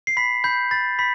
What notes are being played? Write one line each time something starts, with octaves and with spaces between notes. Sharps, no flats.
C7
B5 B6
B5 G6
B5 A6
B5 B6